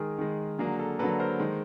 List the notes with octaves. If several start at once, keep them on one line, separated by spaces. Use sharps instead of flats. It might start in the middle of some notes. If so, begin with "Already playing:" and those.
Already playing: D#3 G#3 G#4 A#4
D#3 G#3
D3 F#3 A#3 G#4
A4
D3 F#3 A#3 A4 B4
A#4 C5
D#3 G#3